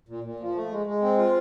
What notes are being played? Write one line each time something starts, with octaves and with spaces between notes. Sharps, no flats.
A#2
A#2
F3
A3
G#3
G#3
C4
F4